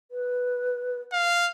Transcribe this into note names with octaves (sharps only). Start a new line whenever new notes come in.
B4
F5